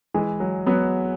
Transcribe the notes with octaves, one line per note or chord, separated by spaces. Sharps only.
E3 G#3
F#3
F#3 B3